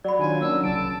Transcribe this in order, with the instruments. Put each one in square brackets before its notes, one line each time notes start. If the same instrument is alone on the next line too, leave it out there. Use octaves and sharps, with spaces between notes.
[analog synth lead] F#3 [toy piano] D5 B5
[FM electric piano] D#3 D4 F4 [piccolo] G#5
[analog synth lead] F#3 [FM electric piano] A#3 C#4 D4 [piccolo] E6
[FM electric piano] C2 C#3 [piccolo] A5 [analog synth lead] D7